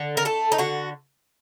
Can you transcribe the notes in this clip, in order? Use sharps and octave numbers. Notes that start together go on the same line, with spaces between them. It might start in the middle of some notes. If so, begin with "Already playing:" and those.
Already playing: D3
A#4
A3 A4
D#4
D3 F#4